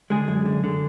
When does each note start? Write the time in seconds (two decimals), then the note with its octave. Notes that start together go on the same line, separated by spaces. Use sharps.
0.10 D3 G#3 G#4
0.28 F#2
0.46 D3
0.64 D3